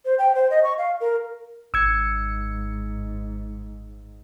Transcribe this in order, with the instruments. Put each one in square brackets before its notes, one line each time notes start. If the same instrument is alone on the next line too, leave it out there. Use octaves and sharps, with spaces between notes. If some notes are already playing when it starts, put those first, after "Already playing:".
[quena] C5
G5
C5
D#5
C#6
F5
A#4
[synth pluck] G#1 C#7 [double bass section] G#2 [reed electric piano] E6 G#6